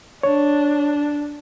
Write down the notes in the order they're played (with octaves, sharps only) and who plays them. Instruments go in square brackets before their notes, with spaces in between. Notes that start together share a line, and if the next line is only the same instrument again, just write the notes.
[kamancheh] D4 [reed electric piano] C#5